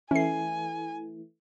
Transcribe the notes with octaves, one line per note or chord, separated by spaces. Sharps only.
E3 A3 C#4 G#5 C7